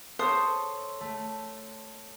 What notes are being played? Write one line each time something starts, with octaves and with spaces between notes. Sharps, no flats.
A4 C5 C#5 D#6
A3